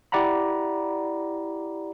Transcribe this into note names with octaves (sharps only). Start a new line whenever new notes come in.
E4 G4 D5 F#5 A#5 B5